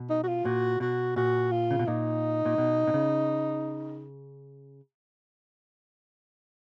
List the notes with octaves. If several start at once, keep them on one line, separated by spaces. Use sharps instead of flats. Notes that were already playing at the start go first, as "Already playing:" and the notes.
Already playing: B2
D#4
F#4
F4
A#2 F#4
B2 F#4
A#2 F#4
F4
C#3
B2
A#2 D#4
A#2
B2
B2
C#3